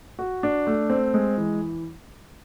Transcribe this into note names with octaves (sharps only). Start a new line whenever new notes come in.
F#4
D4
A3
C4
G#3
E3